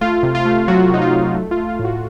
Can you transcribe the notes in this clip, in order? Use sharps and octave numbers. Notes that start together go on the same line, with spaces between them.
A3 F4
C3
F4
A3
F#3 F#4
C3 D#4
F4
F#3
A3
F4
A3
F4
A2
F#4